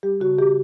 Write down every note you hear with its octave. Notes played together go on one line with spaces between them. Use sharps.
G3 G4
C#3 F#4
C#3 G4